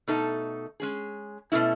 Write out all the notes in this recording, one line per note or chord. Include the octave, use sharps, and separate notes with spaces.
B2 A3 D#4 A4
G#3 C#4 G#4
B2 A3 C#4 E4